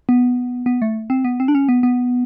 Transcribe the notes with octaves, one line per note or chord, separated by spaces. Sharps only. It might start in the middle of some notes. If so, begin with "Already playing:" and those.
B3
B3
A3
C4
B3
C4
D4
C#4
B3
B3